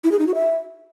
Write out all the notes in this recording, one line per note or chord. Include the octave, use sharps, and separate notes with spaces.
E4
G#4
D#4
F#4
E5